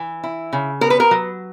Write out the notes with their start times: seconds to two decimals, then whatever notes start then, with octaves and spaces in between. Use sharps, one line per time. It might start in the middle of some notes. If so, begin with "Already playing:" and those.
Already playing: E3
0.23 E4
0.53 C#3
0.81 B3 A#4
0.90 B4
1.00 A#4
1.11 F#3